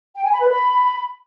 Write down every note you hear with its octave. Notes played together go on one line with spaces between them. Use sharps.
G5
G#5
B5
B4
B5